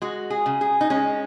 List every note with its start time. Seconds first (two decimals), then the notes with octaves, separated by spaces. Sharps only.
0.02 G#3 F#4
0.30 G#4
0.46 C#3
0.61 G#4
0.81 D#4
0.90 G#3 C#4